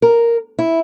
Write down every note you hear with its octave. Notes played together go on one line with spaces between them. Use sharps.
A#4
E4